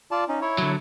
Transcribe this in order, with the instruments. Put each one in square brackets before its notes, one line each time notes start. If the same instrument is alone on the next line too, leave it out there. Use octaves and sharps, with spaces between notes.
[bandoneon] F4 D5 A5
C#4 D#4
E4 C#5
[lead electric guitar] D3 F#3